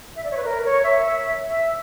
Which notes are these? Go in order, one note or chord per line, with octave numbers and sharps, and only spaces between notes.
E5
D5
C#5
B4
A#4
C#5
E5
E5
E5